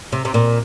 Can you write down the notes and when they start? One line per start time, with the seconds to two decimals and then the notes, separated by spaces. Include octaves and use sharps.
0.12 C3
0.25 C3
0.34 A#2